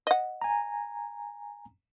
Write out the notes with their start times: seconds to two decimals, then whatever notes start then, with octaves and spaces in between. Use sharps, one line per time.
0.07 D#5 F#5
0.41 G#5 A#5